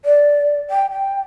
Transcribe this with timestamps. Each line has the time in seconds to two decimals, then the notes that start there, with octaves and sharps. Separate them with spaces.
0.05 D5
0.70 G5
0.91 G5